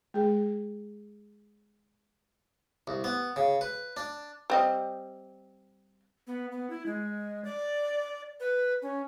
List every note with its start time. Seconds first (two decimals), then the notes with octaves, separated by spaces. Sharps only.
0.14 G#3 G#4
2.87 C2
3.04 B3
3.36 C#3
3.61 B4
3.97 D4
4.50 G3 C4 D#5
6.27 B3
6.52 B3
6.70 E4
6.86 G#3
7.45 D5
8.40 B4
8.82 C#4